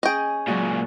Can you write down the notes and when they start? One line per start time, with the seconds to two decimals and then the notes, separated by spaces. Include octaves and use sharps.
0.03 C#4 G#4 D#5 G5
0.48 A#2 C#3 F#3 G#3 F#4